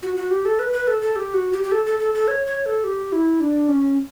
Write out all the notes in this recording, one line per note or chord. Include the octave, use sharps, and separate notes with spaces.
F#4
F#4
G4
A4
B4
B4
A4
A4
G4
F#4
G4
G4
A4
A4
A4
A4
C#5
C#5
A4
G4
E4
D4
C#4